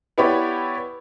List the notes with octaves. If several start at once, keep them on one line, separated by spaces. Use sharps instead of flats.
B3 E4 G4 C#5 D5 B5